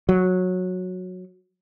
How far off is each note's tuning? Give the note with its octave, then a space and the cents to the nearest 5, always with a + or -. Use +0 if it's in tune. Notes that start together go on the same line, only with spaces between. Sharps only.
F#3 -15